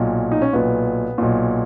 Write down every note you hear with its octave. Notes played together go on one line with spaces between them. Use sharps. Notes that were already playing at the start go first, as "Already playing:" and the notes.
Already playing: B1 A#2
D#4
C#4
B1 A#2 B3
B1 A#2